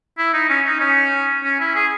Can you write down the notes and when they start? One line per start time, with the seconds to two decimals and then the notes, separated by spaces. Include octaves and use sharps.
0.18 E4
0.34 D#4
0.49 C#4
0.66 D#4
0.81 C#4
1.44 C#4
1.60 E4
1.75 G#4